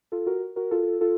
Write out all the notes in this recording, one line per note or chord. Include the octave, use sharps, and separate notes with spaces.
F4 A4
F#4 A#4
F#4 A#4
F4 A4
F4 A4